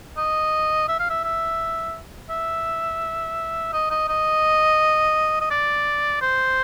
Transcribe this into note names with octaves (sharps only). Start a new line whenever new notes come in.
D#5
E5
F5
E5
E5
E5
D#5
D#5
D#5
D#5
D5
C5